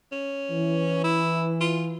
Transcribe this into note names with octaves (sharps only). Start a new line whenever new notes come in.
C#4
E3
E4
F4